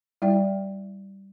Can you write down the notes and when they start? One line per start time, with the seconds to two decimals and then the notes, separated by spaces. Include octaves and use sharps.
0.22 G3 E4 D5 G5